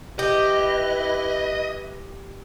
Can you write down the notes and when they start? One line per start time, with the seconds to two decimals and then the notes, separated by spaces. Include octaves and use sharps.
0.19 E4 G4 B4 D#5